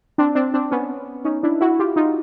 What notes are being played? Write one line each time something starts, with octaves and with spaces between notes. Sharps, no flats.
C4 D4
C4 D4
C4 D4
B3 C#4
C#4 D#4
D4 E4
E4 F#4
F4 G4
D#4 F4